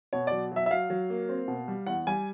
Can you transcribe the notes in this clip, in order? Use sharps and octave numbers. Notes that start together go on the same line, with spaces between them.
B2 C#5
F#3 D5
F#3 E5
E5
F#3 F5
F#3
A#3
C4
B2
G3
E2 F#5
G3 G#5